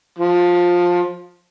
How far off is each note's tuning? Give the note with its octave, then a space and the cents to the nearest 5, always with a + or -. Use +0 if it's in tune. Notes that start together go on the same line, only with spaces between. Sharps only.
F3 +15